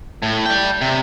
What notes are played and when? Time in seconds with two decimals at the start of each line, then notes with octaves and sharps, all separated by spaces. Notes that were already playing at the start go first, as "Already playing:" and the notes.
0.22 A2
0.46 D5 G5
0.81 C3